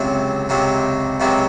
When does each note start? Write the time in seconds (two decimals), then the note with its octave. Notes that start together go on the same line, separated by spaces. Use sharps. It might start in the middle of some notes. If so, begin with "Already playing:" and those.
Already playing: C#2 C3 F#3
0.49 C#2 C3 F#3
1.20 C#2 C3 F#3